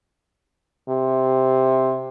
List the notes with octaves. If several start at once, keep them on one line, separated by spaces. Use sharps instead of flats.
C3